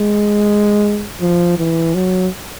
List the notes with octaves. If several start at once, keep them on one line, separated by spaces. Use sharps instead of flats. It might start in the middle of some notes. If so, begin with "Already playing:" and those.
Already playing: G#3
F3
E3
F#3